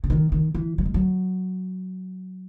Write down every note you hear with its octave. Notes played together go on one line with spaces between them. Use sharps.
C#3
D#3
D#3
E3
F#3
G#3
F#3